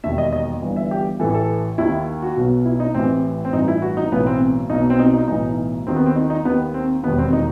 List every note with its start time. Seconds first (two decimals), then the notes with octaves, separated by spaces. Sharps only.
0.04 E1 D#2 D#3 E5
0.18 D#5
0.33 D#5
0.62 G1 G2 E3
0.76 E5
0.91 G4
1.20 A1 A2 E3 A4
1.34 A4
1.78 D#2 D#3 E4
2.22 F#4
2.36 B1 B2
2.65 E4
2.80 D#4
2.94 A1 A2 E3 C4
3.45 C4
3.53 A1 G2 E3 D#4
3.68 E4
3.82 F#4
3.97 D#4
4.12 B1 A2 E3 B3
4.26 C4
4.70 B1 B2 D#4
4.90 C4
4.99 D#4
5.14 D#4
5.28 B1 A2 E3 D#4
5.86 D#2 D#3 C4
5.96 B3
6.06 C4
6.15 D#4
6.30 D#4
6.45 D#2 D#3 B3
6.74 C4
7.03 E1 D#2 D#3 B3
7.18 C4
7.33 D#4